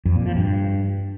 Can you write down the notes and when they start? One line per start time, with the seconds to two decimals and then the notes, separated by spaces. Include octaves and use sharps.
0.05 F2
0.16 A#2
0.26 F3
0.36 G2